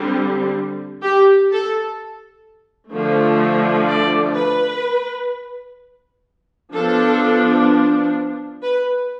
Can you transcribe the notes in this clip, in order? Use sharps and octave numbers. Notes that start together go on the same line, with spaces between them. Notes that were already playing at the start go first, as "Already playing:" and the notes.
Already playing: D3 G3 C4
G4
A4
D3 F3 A3
D5
B4
F3 B3 D4 A4
B4